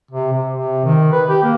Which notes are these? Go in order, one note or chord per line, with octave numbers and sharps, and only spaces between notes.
C3
C3
C3
D#3
B4
G4
A#3